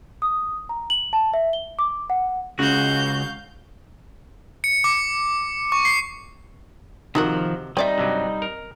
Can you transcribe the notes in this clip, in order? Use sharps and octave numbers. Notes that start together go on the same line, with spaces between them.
D#6
A#5
F#7
A5
E5
G7
D6
F#5
C#2 C#3 F#4 F5 G6
C#7
D6
C#6
C7
C3 D#3 F3 D#4 F#4 A#4 F#5
G3 C4 D#4 D5 E5
G2 C3 F#3
A#4